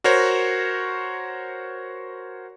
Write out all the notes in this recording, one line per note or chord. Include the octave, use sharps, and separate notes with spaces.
F#4 A#4 C5 C#5